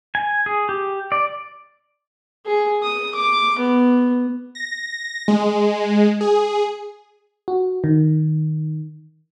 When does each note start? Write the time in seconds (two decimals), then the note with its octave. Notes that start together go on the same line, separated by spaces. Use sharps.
0.15 G#5
0.46 G#4
0.69 G4
1.12 D5
2.46 G#4
2.82 D#6
3.15 D6
3.59 B3
4.55 A#6
5.28 G#3
6.21 G#4
7.48 F#4
7.84 D#3